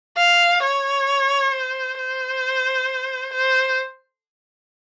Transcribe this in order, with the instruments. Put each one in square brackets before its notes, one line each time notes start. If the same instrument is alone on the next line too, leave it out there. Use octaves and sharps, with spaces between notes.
[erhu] F5
C#5
C5
C5
C5